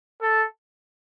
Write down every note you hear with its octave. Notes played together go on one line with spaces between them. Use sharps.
A4